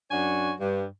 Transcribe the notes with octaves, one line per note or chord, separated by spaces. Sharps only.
F#2 D4 F#4 C#5 G#5
G2